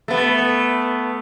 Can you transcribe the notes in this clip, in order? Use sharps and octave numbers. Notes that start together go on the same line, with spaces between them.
A3 B3